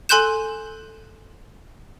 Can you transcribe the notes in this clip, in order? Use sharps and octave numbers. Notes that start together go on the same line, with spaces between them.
A4 G#5 C6 F#6 G6 E7